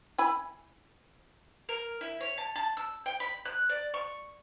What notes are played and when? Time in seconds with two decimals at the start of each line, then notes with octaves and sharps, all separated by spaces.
0.18 E4 G#5 B5
1.69 A#4
2.01 E4
2.21 C#5
2.38 A5
2.56 A5
2.77 E6
3.06 G5
3.20 B5
3.45 F#6
3.69 D5
3.94 C#6